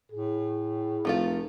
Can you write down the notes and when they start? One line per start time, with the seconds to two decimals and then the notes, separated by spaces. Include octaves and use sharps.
0.12 A2 G#4
1.05 F1 F3 A3 F4